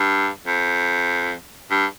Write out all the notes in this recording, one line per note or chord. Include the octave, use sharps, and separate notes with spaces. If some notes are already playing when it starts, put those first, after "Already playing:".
Already playing: G2
F2
G2